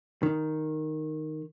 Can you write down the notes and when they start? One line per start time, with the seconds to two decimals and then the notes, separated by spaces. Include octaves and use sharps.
0.23 D#3